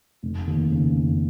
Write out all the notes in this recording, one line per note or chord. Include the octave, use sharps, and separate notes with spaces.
F1
D#2
C#3
F1